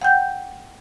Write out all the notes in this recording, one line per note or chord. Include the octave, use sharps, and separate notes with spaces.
F#5 G5 G6